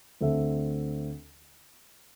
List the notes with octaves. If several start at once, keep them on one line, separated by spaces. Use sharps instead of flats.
D2 D3 C4 A4 E5